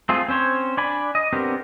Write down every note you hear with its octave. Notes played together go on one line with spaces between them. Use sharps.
A3 C4 F4 G#4
C4 C#4 C5 C#5
D4 D5 G#5 B5
D#5
B3 C4 D4 G4 A#4